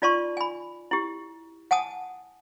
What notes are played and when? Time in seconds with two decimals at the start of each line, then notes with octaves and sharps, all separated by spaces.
0.02 D#4 F4 D5 A5 C6 C#6
0.37 G#5 B5
0.91 E4 G4
1.71 F#5 G#5 A5 D#6